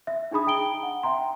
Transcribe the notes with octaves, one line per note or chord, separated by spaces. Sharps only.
E5
D4 D#4 G#4 B5 D#6
D#4 G5 A#5 D7 G7
F#5
E5 G5 A#5 C6